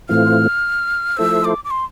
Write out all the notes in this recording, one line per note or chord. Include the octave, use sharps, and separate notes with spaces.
A2 E3 A3 C4 F4 F6
F3 A3 E4 A4 C5 E6
D6
D6
C6